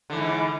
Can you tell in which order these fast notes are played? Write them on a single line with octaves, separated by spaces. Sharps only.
D3 E3 G#2